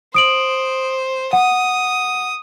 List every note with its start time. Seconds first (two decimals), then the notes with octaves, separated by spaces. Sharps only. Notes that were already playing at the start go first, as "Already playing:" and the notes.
0.15 C5 D#6 D7 F#7
1.33 F#5 D#6